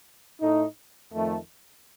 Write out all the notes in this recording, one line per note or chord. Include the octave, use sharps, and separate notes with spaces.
A2 A3 D#4
F2 D#3 A3